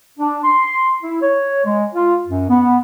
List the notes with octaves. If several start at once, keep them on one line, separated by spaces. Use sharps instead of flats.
D4
C6
E4
C#5
G#3
F4
F#2
B3